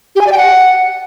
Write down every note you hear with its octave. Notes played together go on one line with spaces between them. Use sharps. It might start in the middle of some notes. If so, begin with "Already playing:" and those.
G4
G#5
D5
G5
F#5